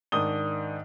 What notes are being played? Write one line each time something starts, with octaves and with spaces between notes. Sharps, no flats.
G#2 D#3 D4 D#6 G7